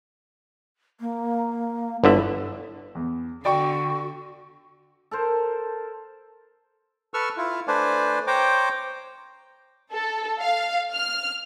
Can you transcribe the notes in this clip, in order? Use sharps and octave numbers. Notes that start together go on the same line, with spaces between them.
A#3
G1 D3 E4 E5
E2
D3 F#4 D5 G5 C#6
A4 A#4 C5
A4 B4 C#6 E6 F6
E4 F4
A3 D4 B4 C5 D5 G#5
C5 C#5 G5 A#5 D6
A4
F5
F6